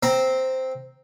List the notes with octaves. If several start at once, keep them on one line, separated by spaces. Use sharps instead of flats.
C4 A#5